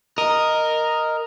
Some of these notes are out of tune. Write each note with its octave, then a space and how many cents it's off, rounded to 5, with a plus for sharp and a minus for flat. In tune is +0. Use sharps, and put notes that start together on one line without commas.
A#4 +0 D#5 +0